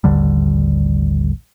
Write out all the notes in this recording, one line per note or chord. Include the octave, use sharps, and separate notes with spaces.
A1 D#2 D3 G3